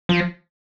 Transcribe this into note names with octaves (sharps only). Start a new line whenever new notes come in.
F3